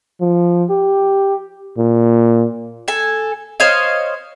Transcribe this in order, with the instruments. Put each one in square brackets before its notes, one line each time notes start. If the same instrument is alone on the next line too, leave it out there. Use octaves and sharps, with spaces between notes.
[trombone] F3
G4
A#2
[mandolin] A4 G#5
C5 C#5 D#5 F5